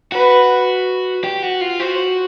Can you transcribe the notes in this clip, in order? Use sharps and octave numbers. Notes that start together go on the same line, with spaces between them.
F#4 B4
G4
F#4
F4
F#4 C5